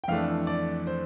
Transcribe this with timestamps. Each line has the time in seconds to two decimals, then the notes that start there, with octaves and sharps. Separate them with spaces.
0.04 G5
0.08 F2 E3 A3 D4 F5
0.47 D5
0.87 C5